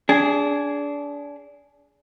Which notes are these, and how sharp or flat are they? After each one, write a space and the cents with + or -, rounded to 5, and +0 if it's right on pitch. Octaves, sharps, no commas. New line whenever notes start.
D4 -25 G#4 +0